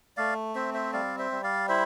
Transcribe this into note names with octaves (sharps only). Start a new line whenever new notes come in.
A3 D5 F5
C4 C5 E5
C5 E5
G3 D5 F5
C5 E5
G3
D5 F5
E4 C5 E5